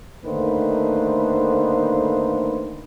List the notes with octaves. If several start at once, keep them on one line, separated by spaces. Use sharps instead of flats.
D3 D#3 A3 A#3 B4 C5